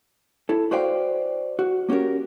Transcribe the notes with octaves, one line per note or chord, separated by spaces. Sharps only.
E4 A4
F#4 B4 C5 D5 F5 G5
F#4
A#3 C#4 F#4 G4 A#4